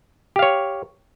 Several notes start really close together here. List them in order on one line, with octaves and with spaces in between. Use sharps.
G4 F5 C#5